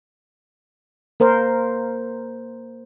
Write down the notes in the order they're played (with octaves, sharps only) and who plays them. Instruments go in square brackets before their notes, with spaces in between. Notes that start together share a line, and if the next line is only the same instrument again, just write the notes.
[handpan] A#3 A#4 C5